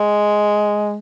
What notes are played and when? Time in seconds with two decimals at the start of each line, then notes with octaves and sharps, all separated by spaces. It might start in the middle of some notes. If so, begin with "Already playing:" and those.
Already playing: G#3